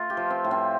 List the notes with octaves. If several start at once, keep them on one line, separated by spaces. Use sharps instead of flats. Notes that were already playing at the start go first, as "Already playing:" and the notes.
Already playing: A3 F4
G4
F3
C4
A2
C4